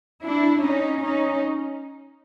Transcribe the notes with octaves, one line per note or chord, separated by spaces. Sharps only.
D4 E4
C#4 D#4
C#4 D#4